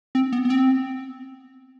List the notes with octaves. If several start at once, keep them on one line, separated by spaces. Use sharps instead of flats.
C4
B3
B3
C4